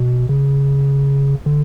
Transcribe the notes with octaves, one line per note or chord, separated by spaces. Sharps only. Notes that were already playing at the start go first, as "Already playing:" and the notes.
Already playing: B2
C#3
D3